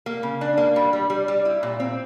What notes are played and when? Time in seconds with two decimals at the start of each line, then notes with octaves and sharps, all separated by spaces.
0.06 A#3
0.23 C#3
0.41 D4
0.57 A#3
0.76 G3
0.93 G3
1.10 G3
1.28 G3
1.45 E4
1.63 A#2
1.80 C4